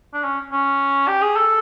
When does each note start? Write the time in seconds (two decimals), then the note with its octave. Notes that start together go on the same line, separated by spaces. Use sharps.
0.14 D4
0.24 C#4
0.52 C#4
1.08 G4
1.22 G#4
1.36 A4